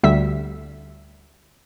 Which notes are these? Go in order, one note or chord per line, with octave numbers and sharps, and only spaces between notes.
D2 G3 E5 B6